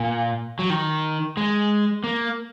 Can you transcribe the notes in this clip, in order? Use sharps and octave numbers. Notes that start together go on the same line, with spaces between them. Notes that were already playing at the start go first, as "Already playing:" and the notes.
Already playing: A#2
F#3
D#3
G#3
A#3